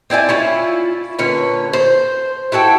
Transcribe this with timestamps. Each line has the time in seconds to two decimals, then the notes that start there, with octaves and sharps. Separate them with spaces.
0.10 C4 E4 D5 G#5
0.29 C#4 E4 F4
1.19 A#2 D3 C#4 B4
1.73 C5
2.52 E4 F#4 A4 G5